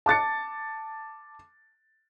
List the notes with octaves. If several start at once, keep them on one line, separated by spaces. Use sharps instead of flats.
A5 D6 A6 C#7